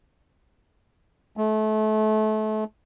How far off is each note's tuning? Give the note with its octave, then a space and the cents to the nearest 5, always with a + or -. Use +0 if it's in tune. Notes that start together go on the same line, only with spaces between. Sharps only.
A3 -30